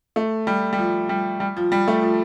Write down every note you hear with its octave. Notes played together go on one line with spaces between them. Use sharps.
A3
G3
G3
F3
G3
G3
F3
G3
A3
F3